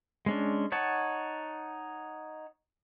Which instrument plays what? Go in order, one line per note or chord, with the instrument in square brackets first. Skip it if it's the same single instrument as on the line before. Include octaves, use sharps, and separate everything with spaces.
[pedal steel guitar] G#3 C#4 D4
D#4 C#5 F#5 A5